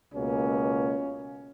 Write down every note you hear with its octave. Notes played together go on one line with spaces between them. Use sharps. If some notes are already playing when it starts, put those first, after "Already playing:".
C#2 B2 A#3 C#4